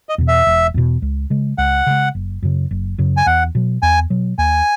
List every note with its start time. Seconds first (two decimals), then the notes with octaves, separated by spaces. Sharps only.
0.09 D#5
0.18 E2 B2
0.28 E5
0.47 E1
0.74 E2 B2
1.02 C#2
1.30 C#3 G#3
1.58 C#2 F#5
1.87 C#3 G#3
2.15 F#1
2.42 F#2 C#3
2.71 F#1
2.98 F#2 C#3
3.17 G#5
3.26 E2 F#5
3.55 B2 F#3
3.82 E2 G#5
4.10 B2 F#3
4.38 D#2 G#5